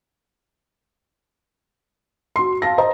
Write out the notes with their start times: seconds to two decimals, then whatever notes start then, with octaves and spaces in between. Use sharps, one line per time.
2.36 F#4 C6
2.62 F5 A5 A#6
2.78 C5 D#5 A#5